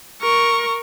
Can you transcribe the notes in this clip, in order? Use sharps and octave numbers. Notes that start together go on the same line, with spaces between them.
A#4 C#6